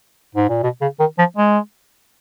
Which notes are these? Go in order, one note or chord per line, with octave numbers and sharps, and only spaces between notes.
G#2
A#2
B2
C#3
D#3
F3
G#3